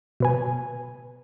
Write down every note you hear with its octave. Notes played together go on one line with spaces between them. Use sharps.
B2 B4 G#5